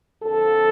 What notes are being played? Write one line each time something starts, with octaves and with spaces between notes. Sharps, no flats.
F2 D3 F3 A4